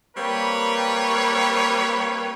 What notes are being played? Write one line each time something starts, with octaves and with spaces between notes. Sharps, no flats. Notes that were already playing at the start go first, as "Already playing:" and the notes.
G3 A#3 C4 B4 C#5